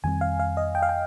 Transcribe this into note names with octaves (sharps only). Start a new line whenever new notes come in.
F2 D#3 G3 C4 G#5
F5
F5
D#5
G5
F5
G5